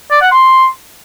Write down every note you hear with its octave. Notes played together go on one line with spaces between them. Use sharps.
D5
F#5
C6